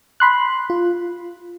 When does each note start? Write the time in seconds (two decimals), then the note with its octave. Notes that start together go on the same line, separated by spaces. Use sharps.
0.20 B5 C6 F#6
0.70 F4